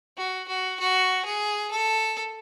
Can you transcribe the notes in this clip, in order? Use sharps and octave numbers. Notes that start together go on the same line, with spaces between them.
F#4
F#4
F#4
G#4
A4